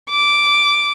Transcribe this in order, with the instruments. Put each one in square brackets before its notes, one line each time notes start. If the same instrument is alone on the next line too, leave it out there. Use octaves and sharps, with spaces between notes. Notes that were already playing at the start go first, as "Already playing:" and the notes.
[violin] D6